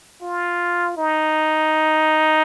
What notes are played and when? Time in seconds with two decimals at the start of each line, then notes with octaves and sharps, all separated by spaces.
0.22 F4
0.97 D#4